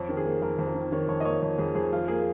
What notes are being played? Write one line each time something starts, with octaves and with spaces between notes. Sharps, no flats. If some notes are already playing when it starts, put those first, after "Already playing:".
Already playing: F2 C#5
D#3
G#4
A#3
F2 A#4
F2
A#4
D#3
D#3 C#5
F2 C#5
D#5
A#3 C#5
F2 C#5
F2 G#4
F2 G#4
F3 F4
A#3 G#4